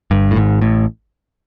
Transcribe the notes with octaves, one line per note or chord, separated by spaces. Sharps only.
G1 G2
A2
G#1 G#2
A1 A2